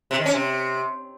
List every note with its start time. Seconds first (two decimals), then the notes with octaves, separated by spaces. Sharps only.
0.11 C3
0.18 D#3
0.26 C#4
0.33 C3